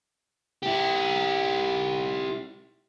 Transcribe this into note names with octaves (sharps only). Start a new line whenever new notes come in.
E4 G4